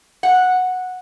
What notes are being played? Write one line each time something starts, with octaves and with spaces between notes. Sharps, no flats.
F#5